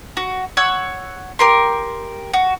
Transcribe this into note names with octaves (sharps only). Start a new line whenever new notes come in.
F#4
C#5 F#5 E6
G4 A#4 C6
F#4